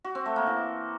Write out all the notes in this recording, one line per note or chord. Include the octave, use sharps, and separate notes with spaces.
F#4
C4
A3
A#3
E3